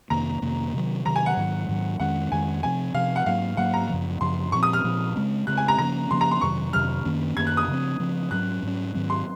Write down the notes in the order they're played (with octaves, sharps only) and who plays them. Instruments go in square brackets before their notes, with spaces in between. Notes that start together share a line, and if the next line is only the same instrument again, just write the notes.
[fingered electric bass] F2 C3 D#3 A#3 [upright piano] A#5
[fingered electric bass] F2 C3 D#3 A#3
C3 D#3 F#3
[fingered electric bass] C3 D#3 F#3 [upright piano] A#5
[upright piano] G#5
F#5
[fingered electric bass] G#2 D#3 F#3
G#2 D#3 F#3
[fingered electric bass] F2 D#3 G#3 C#4 [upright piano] F#5
[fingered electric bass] F2 D#3 G#3 C#4 [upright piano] G#5
[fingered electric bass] C3 F3 C4 [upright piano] G#5
[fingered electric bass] C3 F3 C4 [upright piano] F5
[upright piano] F#5
[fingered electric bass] G#2 F#3 A#3 [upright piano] F5
[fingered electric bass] G#2 F#3 A#3 [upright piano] F#5
[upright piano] A#5
[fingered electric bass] F#2 C#3 F3
[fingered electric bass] F#2 C#3 F3 [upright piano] C6
[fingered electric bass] A#2 F3 C4 [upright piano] C#6
[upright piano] D#6
F6
[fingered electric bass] A#2 F3 C4
C#3 G#3 C4
[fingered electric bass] C#3 G#3 C4 [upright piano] F#6
[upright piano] G#5
A#5
[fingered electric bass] C#3 F3 A#3 C#4 [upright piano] A#5
[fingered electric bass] C#3 F3 A#3 C#4 [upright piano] C6
[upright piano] A#5
C6
[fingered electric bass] F2 C3 D#3 F#3 [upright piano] C#6
[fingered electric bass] F2 C3 D#3 F#3 [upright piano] F6
[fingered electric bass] F#2 D#3 A#3 C#4
[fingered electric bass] F#2 D#3 A#3 C#4 [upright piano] G#6
[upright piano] F#6
D#6
[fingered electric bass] C#3 F3 C4
C#3 F3 C4
[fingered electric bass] G#2 F#3 C#4 [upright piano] F#6
[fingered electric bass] G#2 F#3 C#4
G#2 D#3 F#3 C4
[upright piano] C6